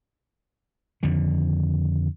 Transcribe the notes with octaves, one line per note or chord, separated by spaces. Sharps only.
F2 D3 D#3